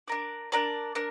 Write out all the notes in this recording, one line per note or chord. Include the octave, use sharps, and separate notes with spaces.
D4 A#4 D5
D4 A#4 D5
D4 A#4